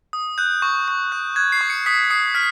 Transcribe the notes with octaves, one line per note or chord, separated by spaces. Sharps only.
D#6
F#6 G6
C#6
C#6
F#6
F#6 G#6
C7
C#6
C#7
D#6 B6
D#6 C7
F6 B6